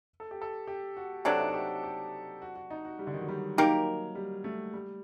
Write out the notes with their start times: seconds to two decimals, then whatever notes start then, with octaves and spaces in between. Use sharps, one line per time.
0.20 A4
0.31 G4
0.41 A4
0.67 G4
0.97 F#4
1.25 C3 F#3 A3 D4 A4
1.40 D#4
1.47 F#4
1.54 G4
1.83 G4
2.42 F#4
2.56 F#4
2.70 D#4
2.85 F#4
2.99 G3
3.07 D3
3.14 D#3
3.21 F#3
3.29 G3
3.57 F#3 A#3 D#4 G4 A#4
4.15 G3
4.44 A3
4.74 G3